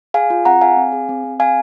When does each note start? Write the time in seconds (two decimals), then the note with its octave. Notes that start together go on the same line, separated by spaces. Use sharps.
0.14 G#4 F5 G#5
0.30 F4
0.45 C4 F#5 A#5
0.61 G#4 F5 G#5
0.77 C4
0.92 G#4
1.09 C4
1.24 C4
1.40 G#4 F5 G#5